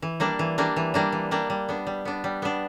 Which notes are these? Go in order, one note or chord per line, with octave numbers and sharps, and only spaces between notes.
E3
G3 A#3 D4
E3
G3 A#3 D4
E3
G3 A#3 D4
E3
G3 A#3 D4
G3
B3 D4
G3
B3 D4
G3
B3 D4